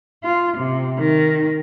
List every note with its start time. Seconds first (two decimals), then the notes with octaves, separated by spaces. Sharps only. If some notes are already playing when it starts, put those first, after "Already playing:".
0.23 F4
0.58 C3
0.99 D#3